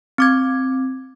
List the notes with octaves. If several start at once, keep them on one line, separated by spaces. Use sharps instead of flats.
C4 D6 G#6